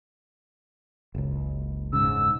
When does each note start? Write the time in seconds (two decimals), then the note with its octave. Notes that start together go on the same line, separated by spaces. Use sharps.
1.15 F#1 C#2
1.93 E1 G#2 C#3 E6